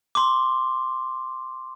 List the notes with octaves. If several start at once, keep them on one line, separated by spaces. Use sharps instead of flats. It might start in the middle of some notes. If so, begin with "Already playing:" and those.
C6 D6